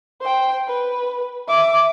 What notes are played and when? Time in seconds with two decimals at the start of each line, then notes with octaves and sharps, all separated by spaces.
0.21 C5 G5
0.67 B4
1.47 E5 D6